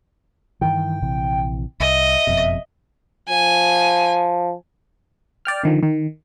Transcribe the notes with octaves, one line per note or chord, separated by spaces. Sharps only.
G2 D#3 E3 G5
A#1 C3 E3
C2 D#5 E5
F#1 F2 B2
F3 G#5
D5 G5 F6
D3 D#3 F3
D#3